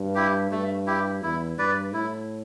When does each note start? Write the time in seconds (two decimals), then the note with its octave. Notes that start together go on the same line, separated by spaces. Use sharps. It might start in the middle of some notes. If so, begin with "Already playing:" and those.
Already playing: G2
0.15 E4 G4
0.51 G2 A3
0.87 E4 G4
1.22 E2 E4
1.58 G2 B4 D5
1.94 A2 E4